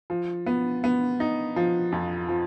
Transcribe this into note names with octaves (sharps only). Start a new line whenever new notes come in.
F3
B3
B3
D#4
F3
F2
F3